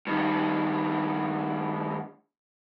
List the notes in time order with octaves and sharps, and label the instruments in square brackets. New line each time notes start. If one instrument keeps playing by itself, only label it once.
[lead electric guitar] G2 D#3